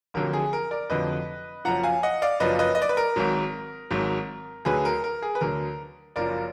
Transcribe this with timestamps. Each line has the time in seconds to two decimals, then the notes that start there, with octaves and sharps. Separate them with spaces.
0.14 F1 F2 D3 F#3 A#4
0.33 G#4
0.53 A#4
0.71 A#4 D5
0.90 F1 F2 D3 F#3 B4 D#5
1.65 F#1 F#2 F3 F#5 A#5
1.83 F5 G#5
2.03 D#5 F#5
2.22 D5 F5
2.40 F#1 F#2 F3 B4 D#5
2.59 B4 D#5
2.75 D#5
2.82 D5
2.89 B4
2.97 A#4
3.16 G#1 G#2 F#3
3.91 G#1 G#2 F#3
4.65 D2 D3 F#3 G#4 B4
4.85 A#4
5.04 A#4
5.22 G#4
5.35 B4
5.41 D2 D3 F#3 A#4
6.16 F#1 F#2 F3 A#4 D5